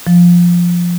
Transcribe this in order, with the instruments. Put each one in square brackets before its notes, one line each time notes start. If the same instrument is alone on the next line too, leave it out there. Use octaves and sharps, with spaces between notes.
[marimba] F3